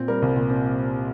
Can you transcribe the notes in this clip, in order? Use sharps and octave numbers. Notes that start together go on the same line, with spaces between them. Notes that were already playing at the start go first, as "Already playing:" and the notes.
Already playing: A#2 C4
G3 A#4
C2
A#2
C4